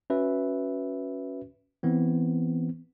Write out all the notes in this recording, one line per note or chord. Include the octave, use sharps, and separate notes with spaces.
C#4 F#4 B4 E5
E3 B3 C4